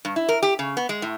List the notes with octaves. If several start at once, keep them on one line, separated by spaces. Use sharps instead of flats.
G2
E4
A#4
G4
C#3
B3
G#3
A2